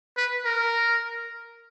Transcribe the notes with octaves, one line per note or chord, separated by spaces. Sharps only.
B4
A#4